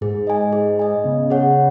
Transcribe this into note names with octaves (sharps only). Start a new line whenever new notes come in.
G#2 G#4
D#5 G#5
G#4
D#5 G#5
C#3 B3
G#4 C#5 F#5